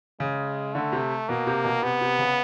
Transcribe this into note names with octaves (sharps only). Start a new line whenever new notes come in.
C#3 G#3
D3 A3
C3
B2 A#3
C3
B2
C3 B3
C3
C#3